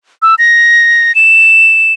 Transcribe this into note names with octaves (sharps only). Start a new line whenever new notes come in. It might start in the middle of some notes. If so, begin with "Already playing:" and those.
E6
A#6
E7